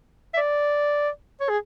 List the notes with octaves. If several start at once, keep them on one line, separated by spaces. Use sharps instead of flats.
E5
D5
C#5
G#4